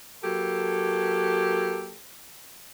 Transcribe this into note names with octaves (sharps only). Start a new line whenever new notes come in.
F#3 A#3 G4 A4